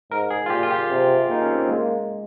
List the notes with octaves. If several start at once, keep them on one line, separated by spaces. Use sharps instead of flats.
G#2 A#4
G#4
F4
A#2 G4
F4
G4
C3
A#3 D#4
C#4
C4
A#3
G#3 A#3